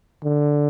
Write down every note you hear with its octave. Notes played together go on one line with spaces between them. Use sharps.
D3